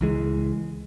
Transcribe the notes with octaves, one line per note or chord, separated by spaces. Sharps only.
C#2 E3 G#3